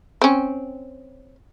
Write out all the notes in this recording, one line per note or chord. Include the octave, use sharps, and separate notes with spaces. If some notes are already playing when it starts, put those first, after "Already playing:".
C4 C#4